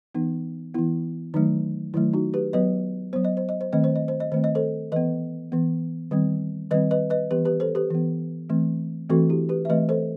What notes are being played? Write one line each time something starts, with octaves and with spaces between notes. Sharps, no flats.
E3 B3 D#4
E3 B3 E4
D#3 F#3 A3 D#4
D#3 F#3 A3 E4
D#4 F#4
G4 B4
F#3 B3 B4 D#5
F#3 B3 C5
D#5
C5
D#5
C5
D#3 A3 C4 D#5
C5
D#5
C5
D#5
D#3 A3 C4 C5
D#5
A4 C5
E3 B3 B4 D#5
E3 B3
D#3 G3 C4
D#3 G3 C4 B4 D#5
B4 D#5
B4 D#5
E3 B3 G4 B4
G4 B4
A4 C5
G4 B4
E3 B3
E3 A3 C4
E3 A3 C4 F#4 A4
E4 G4
G4 B4
E5
E3 A3 C4 B4 D#5
A4 C5